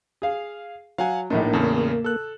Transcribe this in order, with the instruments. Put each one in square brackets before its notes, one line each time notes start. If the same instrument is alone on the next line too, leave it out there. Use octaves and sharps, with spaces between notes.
[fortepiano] G#4 F5
[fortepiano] F#3 [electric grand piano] F5 F#5 G#5
[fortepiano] A#1 A2 D4 [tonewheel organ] A#3 [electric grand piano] D#4
[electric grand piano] E2 A2 C#3 [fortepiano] A5
[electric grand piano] A4 F#6